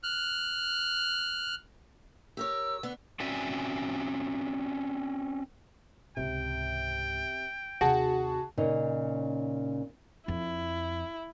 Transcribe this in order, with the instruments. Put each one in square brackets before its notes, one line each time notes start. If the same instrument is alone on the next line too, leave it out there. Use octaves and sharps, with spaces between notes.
[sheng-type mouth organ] F6 F#6
[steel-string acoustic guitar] G4 A#4 C#5 [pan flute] E6
[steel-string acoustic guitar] D3 B3
[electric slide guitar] C4 C#4 F#4 D5 E5 G#5
[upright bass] C#2 G#2 [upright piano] C3 [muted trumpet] G5
[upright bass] D#2 C3 [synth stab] F#4 [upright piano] G#4 A5
[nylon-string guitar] A#2 C#3 C#4 D#4
[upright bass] F2 [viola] E4